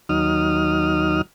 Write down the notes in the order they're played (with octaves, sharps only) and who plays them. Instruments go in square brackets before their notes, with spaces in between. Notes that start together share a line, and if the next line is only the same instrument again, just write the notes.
[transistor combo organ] D#2 F#3 D#4 D#6 F6